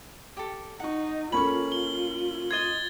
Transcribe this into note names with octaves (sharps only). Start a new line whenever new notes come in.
G4 A4
D#4 F#5 C#6
A#3 C#4 F4 A4 B5 C#6 F#7
G7
C5 D#5 G#6 A6 G7